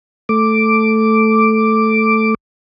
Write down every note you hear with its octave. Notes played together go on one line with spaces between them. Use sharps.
A3 D6